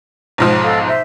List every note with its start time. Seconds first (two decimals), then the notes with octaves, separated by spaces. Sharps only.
0.38 B1 G#2 F3
0.63 A4 F5
0.86 C5 E5